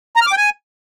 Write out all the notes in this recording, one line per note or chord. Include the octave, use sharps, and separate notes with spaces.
A#5
F6
D6
G5
G#5